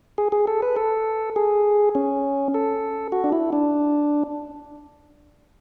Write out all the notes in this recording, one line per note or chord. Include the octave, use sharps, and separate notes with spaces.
G#4
G#4
A4
B4
A4
G#4
C#4
A4
F#4
D4
E4
D4